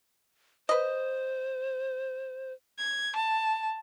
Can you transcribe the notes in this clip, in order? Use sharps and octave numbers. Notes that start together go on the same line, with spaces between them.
B4 C5 D#5
G#6
A5